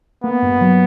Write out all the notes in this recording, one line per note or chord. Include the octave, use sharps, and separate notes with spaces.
A#3 B3
G2
F#3